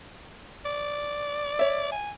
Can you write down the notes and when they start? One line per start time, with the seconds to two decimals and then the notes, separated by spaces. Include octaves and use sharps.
0.65 D5
1.59 C#5 E5
1.92 G#5